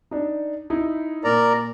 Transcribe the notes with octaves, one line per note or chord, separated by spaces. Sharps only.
D4 D#4
D#4 E4
A#2 A#4 D5 A#5